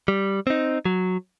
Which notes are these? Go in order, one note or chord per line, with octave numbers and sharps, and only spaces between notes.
G3
C4 D#4
F#3